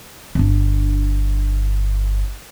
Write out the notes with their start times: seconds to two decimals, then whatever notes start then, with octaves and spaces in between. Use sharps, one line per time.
0.35 G1 D4